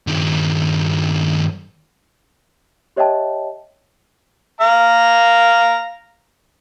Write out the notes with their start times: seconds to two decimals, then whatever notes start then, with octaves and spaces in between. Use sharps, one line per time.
0.07 G2 D#3
2.96 G4 C#5 D#5 E5 G5 A5
4.61 F5 A#5